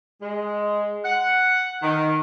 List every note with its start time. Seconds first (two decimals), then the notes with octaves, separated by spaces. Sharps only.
0.22 G#3
1.04 F#5
1.82 D#3